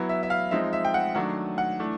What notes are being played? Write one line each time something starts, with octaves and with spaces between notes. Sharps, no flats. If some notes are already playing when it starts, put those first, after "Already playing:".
Already playing: F#3 B3 E4
E5
E5
F5
F3 G#3 C4 D#4 E5
E5
G5
F#5
D#3 F#3 A3 D4 F#5
F#5
E3 A3 D4